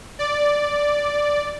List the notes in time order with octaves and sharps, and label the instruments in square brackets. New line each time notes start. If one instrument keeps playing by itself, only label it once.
[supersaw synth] D5